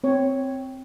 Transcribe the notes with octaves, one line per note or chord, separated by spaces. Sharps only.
C4 C#5